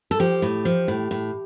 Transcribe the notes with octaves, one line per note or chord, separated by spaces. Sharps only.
A4
F3 G4
A2
F3
A2
A2